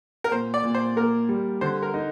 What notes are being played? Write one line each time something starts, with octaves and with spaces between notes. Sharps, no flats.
A#4
A#2 C5
D5
A#2
C5
A#3 A#4
G3
D3 C5
A#4
D#4